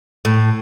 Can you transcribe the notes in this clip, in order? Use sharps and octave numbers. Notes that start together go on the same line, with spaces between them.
A2